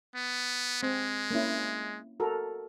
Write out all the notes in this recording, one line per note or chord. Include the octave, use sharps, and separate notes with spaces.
B3
G#3 C4
A#3 C#4 E4
F#4 A4 A#4